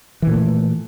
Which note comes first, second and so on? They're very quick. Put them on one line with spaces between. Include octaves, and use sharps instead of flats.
E3 A#2 A3